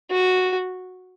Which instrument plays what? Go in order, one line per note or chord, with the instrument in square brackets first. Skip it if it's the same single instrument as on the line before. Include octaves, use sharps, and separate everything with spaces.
[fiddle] F#4